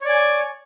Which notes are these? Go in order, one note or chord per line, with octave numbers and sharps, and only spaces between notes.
C#5 D5 G#5